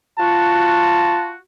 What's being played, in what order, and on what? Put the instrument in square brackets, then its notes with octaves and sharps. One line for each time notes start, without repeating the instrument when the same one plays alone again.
[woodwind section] F4 F#4 [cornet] A5